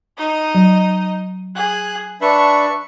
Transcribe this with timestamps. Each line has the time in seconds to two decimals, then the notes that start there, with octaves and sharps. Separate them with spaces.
0.18 D#4 D#5
0.55 F#3
1.55 G#4 F#6
2.21 D4 B4 E5 C#6